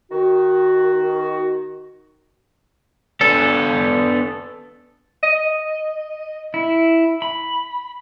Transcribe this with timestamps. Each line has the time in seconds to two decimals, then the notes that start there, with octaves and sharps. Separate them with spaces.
0.11 D#3 F#4
3.21 B3 D4 A4
5.23 D#5
6.54 E4
7.22 B5